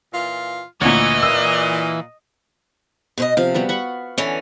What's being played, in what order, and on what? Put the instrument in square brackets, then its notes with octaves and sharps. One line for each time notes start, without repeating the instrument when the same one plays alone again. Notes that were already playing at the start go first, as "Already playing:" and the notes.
[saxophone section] A#2 E3 F4
[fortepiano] D2 A#2 [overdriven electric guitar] E3 [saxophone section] C#5 [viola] D#5
[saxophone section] A#2 [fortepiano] E6
[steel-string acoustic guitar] B2 C5 D#5
[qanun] C3 F3 [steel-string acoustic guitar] F5
[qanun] G3 B3 F#4
F#5 B5 C#6
[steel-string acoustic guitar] D3 E3 C#4